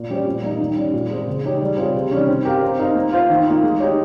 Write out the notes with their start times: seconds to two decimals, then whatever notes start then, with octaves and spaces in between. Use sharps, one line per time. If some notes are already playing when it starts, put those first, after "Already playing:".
Already playing: A#2
0.10 G3 C#4 G4 C5
0.26 A#2
0.42 G3 A#3 D#4
0.60 D#3
0.76 G3 C#4
0.93 A#2
1.10 G#3 C4
1.27 C#3
1.44 G#3 D#4 G4 C#5
1.61 G3
1.77 C4 F4 G#4 C#5
1.95 C3
2.11 D#3 G3 C#4
2.28 C4
2.45 G4 A#4 F5
2.62 C4
2.79 D#4 A#4 F5
2.95 A#3
3.12 F4 C5 F5
3.29 D#3
3.46 A#3 F4
3.63 G#3
3.80 D#4 G4 C#5